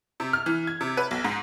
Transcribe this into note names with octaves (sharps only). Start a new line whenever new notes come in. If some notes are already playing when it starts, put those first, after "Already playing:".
C3
F6
E3
G#6
C3
B4
B1
G#2